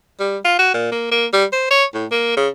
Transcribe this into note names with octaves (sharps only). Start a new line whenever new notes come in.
G3
F4
F#4
A#2
A#3
A#3
G3
C5
C#5
A2
A#3
C#3